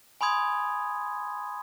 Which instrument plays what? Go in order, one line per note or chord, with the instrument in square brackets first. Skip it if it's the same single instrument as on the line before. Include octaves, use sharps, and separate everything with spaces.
[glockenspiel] G#5 B5 C6 D#6 G#6